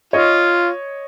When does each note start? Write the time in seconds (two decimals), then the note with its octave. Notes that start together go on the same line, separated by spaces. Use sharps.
0.13 F4 C#5 D#5